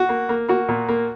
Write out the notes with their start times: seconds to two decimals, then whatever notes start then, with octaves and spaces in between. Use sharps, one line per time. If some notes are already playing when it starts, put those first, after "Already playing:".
Already playing: F#4
0.09 A#3
0.29 A#3
0.49 A#3 F#4
0.69 A#2
0.89 A#3